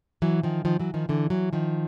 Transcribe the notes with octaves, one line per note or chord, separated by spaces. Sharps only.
E3 F#3
D#3 F3
D#3 F3
E3 F#3
D#3 F3
D3 E3
E3 F#3
D#3 F3